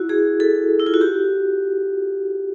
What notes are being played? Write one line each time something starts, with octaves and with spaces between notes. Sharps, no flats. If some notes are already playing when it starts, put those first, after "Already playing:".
Already playing: E4 F#4
G#4
A4
E4
F4
F#4
G4